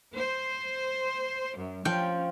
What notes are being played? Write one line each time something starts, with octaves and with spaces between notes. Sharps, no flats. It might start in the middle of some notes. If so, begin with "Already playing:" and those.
C5
F#2
F3 C#4 G5